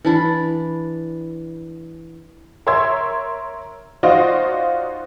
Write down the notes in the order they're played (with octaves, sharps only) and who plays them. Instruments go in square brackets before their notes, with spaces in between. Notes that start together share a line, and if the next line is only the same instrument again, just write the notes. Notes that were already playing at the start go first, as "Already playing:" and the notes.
[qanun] E3 D4 B5
[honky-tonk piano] A#4 C#5 E5 C6 E6 G#6
D#4 F4 F#4 C5 D5 D#5